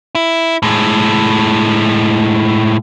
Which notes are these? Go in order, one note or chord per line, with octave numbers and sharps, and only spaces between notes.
E4
A2 G#3